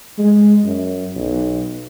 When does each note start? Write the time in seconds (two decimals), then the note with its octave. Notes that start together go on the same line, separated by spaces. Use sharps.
0.19 G#3
0.65 F#2
1.16 B1